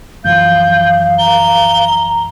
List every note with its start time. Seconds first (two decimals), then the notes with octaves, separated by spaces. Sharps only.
0.24 F#2 E3 F3 F5 G6
1.19 A#5 G7